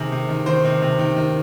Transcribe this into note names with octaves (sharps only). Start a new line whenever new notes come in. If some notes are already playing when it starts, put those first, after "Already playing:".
Already playing: C3 D#3 G#4
C3
D#3
D#3 C5
C3
C3
D#3
D#3